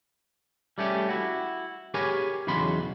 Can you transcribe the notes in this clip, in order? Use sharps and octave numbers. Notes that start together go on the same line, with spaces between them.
G3 A3 C#4 G4
E4 F#4
G4 G#4 A#4 B4 C#5 G#5
B1 E2 C#3 F#4 B5 C6